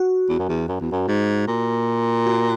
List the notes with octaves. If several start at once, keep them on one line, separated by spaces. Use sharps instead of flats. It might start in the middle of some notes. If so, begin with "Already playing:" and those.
Already playing: F#4
E2
F#2
E2
F#2
E2
F#2
G#2
A#2
F#4